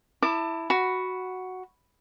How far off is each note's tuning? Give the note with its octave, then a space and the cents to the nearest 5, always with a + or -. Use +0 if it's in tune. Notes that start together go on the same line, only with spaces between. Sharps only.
E4 +0 A5 +30 D6 +35
F#4 +0 B5 +0